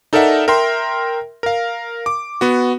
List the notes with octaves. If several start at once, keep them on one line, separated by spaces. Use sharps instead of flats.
D#4 A4 A#4 D5 E5 F#5
A#4 E5 G5 C6
A#4 F5
D6
B3 F#4